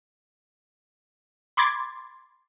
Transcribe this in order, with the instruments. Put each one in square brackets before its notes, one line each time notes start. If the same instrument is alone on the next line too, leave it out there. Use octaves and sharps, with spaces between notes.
[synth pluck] B5 C6 D6 G#6 A6